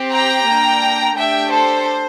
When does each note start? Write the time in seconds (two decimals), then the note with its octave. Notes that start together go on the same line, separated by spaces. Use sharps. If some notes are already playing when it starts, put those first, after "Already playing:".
Already playing: C4 G4
0.14 G5 A#5
0.50 A#3 D4 A4
1.18 A3 D4 G4 E5 G5
1.52 A4 C5